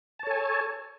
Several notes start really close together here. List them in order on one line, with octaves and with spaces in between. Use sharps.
A5 C#5 A4 G#5